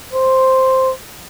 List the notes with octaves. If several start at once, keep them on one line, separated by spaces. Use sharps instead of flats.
C5